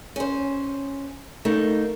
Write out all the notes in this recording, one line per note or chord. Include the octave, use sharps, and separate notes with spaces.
C#4 C5
A3 A#3 D#4